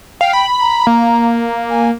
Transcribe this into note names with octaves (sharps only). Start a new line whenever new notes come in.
F5 G5
B5
A#5
A#3
G#5